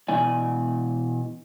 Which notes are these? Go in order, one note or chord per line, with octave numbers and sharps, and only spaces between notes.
B2 E3 D5 G#5